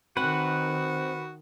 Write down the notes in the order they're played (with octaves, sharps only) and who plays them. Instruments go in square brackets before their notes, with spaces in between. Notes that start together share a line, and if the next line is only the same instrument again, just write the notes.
[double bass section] D#3 [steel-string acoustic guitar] C4 [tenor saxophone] F#4 [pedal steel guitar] B4 F#5